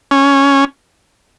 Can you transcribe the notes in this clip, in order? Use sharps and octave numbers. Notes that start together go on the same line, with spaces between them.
C#4